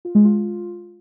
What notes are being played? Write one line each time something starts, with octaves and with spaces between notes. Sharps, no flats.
F4
G#3
F4